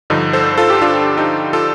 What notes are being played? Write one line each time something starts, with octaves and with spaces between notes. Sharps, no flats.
G2 D3 F3 D#4
A4 C5
F4 A4
G4
D4 F4
D#4 G4
F4 A4